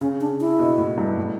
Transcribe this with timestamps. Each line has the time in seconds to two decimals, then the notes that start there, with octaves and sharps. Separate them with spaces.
0.01 C#3 C#4
0.20 D4
0.40 E4
0.59 B2
0.78 A2
0.98 G2
1.18 A2